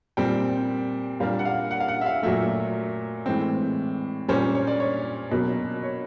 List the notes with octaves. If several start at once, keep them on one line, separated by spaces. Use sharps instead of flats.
A#2 G3 C4 G5
A#2 G3 A#3 D4 F5
F#5
F5
F#5
F5
F#5
E5
F5
A#2 F#3 A3 E5
A2 E3 G#3 C4
A#2 G3 A#3 C#4 C5
C#5
D5
C#5
B2 F#3 A#3
C#5